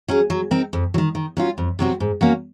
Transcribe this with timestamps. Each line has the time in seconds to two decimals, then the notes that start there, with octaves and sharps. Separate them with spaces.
0.08 F#3 C#4 G#4
0.30 F#3
0.51 C4 D#4 A#4
0.73 F2
0.94 F#3
0.98 D#3
1.15 D#3
1.37 F#3 C#4 F4
1.58 F2
1.79 C3 F#3 C4 F#4
2.00 G#2
2.21 F#3 A#3 C#4 F#4